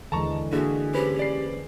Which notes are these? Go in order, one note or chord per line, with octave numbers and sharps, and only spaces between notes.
D#2 D3 E3 G#3 A5 A#5 C#6
D3 A#3 E4 F#4 G#4
C#4 G4 B4 C5
D5 C7